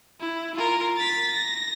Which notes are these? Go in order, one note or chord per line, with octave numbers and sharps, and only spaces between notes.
E4
F4 A#4
A6 B6
A#6